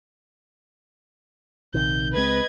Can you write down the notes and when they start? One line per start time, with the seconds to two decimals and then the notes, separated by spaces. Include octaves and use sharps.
1.74 A#1 C3 D#3 G6
2.15 C#2 G#3 C4 B4 D#5 G#6